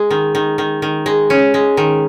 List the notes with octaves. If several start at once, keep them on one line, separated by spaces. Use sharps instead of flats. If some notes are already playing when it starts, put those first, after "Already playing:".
Already playing: G#3
D#3
D#3
D#3
D#3
G#3
C#4
G#3
D#3